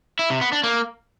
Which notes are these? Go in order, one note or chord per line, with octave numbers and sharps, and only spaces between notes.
E4
C3
B3
D4
A#3